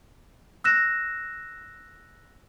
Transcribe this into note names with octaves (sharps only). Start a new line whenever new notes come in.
E6 F#6 A#6 E7